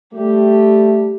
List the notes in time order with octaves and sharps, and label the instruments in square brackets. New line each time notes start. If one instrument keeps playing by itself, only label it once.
[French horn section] G3 A3 [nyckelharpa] G4